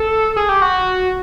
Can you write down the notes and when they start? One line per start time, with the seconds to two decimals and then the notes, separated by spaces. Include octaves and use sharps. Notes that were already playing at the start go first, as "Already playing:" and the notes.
Already playing: A4
0.37 G#4
0.49 G4
0.62 F#4